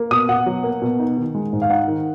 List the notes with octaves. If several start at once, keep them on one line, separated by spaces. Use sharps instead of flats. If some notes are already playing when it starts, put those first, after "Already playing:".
Already playing: A#3
B2 D#6
B2 F#5
F#3
A#3
B2
D#4
D#3
G#3
G#2
F5
D#4 F#5
D#3